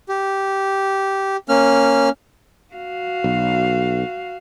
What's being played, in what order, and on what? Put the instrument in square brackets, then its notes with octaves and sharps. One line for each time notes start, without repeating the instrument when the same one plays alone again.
[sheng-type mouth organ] G4
A#3 C#4 F6
[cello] F#4 F5
[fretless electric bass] B1